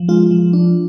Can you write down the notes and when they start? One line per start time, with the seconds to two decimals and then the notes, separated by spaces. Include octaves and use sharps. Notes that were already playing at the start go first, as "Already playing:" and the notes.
Already playing: F3
0.08 G#3 F4
0.31 F3
0.53 D4